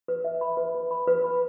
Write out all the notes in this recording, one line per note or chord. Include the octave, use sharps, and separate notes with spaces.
B4
E5
B5
B4
B4
B5
B4
B5